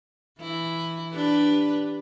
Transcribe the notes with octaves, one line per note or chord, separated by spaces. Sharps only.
E3 E4
D4 G4 B4